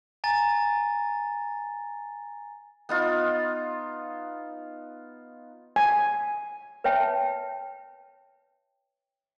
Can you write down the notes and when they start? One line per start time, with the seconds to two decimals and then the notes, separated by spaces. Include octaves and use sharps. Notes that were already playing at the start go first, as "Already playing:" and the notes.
0.24 G#5 A#5 A6
2.89 B3 D#4 F4
5.76 G#5
6.84 B4 C#5 E5 G5 A5